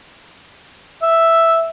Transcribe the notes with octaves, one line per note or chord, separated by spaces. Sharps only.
E5